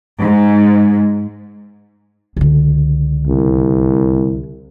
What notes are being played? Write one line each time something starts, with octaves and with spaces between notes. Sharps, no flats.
G#2
C#2 D3
C2